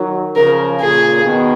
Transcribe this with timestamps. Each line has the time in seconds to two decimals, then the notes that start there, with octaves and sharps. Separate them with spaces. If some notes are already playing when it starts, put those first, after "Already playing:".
Already playing: D#3 F#3
0.36 C#3 F3 A#4
0.80 A#2 C#3 G#4
1.24 B2 D#3